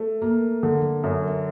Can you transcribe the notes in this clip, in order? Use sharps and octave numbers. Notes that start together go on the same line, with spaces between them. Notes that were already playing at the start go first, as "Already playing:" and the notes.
Already playing: A3
A#3
D3
F#2